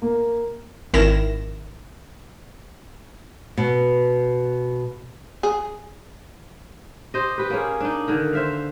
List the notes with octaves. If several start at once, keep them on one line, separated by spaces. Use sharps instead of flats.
A#3
G#1 D#3 E4 A#6 E7
B2
G#4
G4 C5 D#5
G4 B4
A#3 C#4 G#4
D4 D#4
D3 D#3
C5 E5 F5